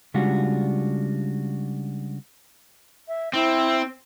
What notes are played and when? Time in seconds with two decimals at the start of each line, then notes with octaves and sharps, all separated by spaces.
0.14 C#3 G3 G#3 D4 F4 F#4
3.08 E5
3.33 C4 E4